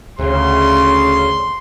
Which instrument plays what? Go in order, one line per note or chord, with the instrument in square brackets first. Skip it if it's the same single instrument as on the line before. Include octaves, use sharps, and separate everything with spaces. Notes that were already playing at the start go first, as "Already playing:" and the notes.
[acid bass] D2 [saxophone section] C#3 [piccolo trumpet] C6